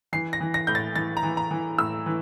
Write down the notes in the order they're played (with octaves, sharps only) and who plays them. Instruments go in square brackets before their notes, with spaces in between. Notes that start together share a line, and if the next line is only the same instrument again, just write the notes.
[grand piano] E3 C7
A#6
E3
A#6
A2 G6
A6
E3 A6
A#5
E3
A#5
E3
A2 E6
E3